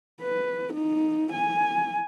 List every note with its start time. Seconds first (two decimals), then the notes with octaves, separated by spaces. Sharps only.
0.21 B4
0.73 D#4
1.32 G#5